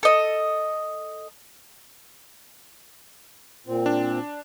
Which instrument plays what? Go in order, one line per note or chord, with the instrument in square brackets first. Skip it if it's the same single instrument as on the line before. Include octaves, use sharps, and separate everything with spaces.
[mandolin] A4 D#5
[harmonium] A#2 C4
[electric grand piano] D4